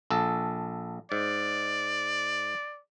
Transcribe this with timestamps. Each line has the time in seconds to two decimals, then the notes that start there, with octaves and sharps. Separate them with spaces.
0.10 A#1 A4
1.12 G#2 D5